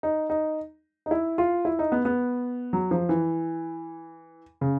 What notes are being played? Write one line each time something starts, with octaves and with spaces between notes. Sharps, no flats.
D#4
D#4
D#4
E4
F4
E4
D#4
B3
B3
F#3
F3
E3
C#3